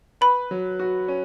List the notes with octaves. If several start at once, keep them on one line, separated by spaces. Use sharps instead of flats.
B4 B5
F#3
F#4
C#4